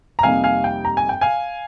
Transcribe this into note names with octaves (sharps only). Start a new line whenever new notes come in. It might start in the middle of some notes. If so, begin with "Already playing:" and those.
A#5
F2 C3 G3 A#3 D#4 F5 G#5
F5 G#5
G5
A#5
G#5
G5
F5 G#5